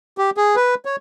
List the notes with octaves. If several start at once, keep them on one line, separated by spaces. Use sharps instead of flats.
G4
G#4
B4
C#5